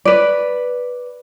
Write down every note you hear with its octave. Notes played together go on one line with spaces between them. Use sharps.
B4 D5